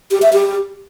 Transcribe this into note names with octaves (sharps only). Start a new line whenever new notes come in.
G4
E5
G4